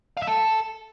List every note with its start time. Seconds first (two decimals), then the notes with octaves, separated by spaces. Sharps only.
0.17 F5
0.22 E5
0.27 A4